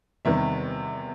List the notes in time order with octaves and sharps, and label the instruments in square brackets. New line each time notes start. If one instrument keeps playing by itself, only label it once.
[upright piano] E2 C3 D#3 G3 E5